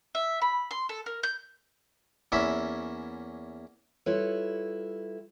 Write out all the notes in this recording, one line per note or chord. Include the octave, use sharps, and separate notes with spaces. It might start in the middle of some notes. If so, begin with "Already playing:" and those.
E5
B5
C6
A4
A#4
G6
E2 A#3 C#4 E5 B5
G3 E4 F4 A4 B4 C#5